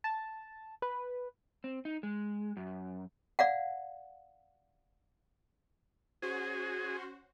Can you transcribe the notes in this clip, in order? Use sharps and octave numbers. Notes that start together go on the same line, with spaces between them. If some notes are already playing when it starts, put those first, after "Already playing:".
A5
B4
C4
D#4
G#3
F#2
D5 F5 F#5
C#4 F#4 G#4 C5